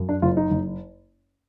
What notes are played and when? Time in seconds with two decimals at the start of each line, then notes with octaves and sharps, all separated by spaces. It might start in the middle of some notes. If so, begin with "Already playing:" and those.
Already playing: F#2
0.09 D4
0.22 F#1 F4
0.37 D#4
0.51 F#1